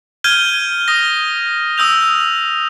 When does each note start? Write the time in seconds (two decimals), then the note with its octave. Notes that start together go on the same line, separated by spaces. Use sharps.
0.24 F6 G6 G#6 D#7 G7
0.88 D#6 A#6
1.78 D#6 E6 G6 F7